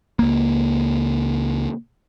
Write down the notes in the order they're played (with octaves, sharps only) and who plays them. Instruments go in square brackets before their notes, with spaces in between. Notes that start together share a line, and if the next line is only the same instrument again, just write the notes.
[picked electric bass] C#2 A#3